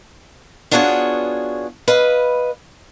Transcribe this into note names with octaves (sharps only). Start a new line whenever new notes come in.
B3 D4 F4 F#4 G#4 C#5
B4 D#5 F5